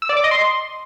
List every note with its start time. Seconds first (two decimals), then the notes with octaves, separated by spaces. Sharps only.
0.02 E6
0.09 D5
0.17 D6
0.24 D#5
0.31 C6